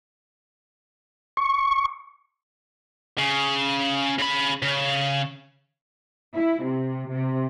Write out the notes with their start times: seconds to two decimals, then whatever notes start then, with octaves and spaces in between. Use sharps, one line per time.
1.37 C#6
3.19 C#3
4.18 C#3 B5
4.62 C#3
6.35 E4
6.64 C3
7.11 C3